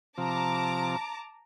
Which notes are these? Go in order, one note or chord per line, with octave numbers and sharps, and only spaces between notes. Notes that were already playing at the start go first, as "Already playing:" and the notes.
C3 F3 A5 A#5 D6